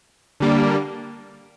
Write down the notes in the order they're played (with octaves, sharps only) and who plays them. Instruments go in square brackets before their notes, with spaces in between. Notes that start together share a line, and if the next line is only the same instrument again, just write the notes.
[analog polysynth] D3 G3 A#3